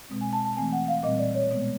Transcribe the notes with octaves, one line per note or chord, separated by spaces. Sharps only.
B2 G#3 C4
G#5
A5
A5
E3 A3 C4 G#5
F#5
F5
A#2 G3 C4 D#5
D5
C#5
B2 G#3 B3